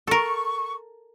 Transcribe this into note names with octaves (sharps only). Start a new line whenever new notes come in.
A4 A#4 C#6